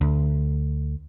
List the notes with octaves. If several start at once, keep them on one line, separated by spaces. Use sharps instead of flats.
D2